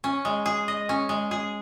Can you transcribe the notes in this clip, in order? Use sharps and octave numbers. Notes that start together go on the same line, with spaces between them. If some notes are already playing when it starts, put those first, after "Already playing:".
C#4
G#3
G#4
D#5
C#4
G#3
G#4